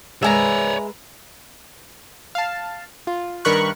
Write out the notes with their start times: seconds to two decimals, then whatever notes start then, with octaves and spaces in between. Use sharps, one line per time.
0.23 G#3 A#4 B4 C#5 D5 E5 G#5 A#5
2.35 F5 A5
3.07 F4
3.45 G2 D#3 A#4 B5 C#6 F#6